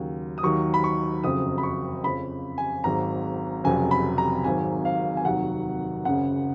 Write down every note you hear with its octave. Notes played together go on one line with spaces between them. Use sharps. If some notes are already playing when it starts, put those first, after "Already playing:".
Already playing: D#2 C#3 F#3
D#6
D#2 D#3 F#3 C#6
B5
C#6
F#1 F2 C#3 F#3 D#6
B5
C#6
F2 C#3 F3 B5
G#5
G#1 G#2 F#3 A#5
F1 F2 C#3 F#3 G#5
B5
A#5
G#1 G#2 D#3 F#3 G#5
F5
G#5
F1 D#2 D#3 F#3 F#5
F#1 F#2 C#3 F#5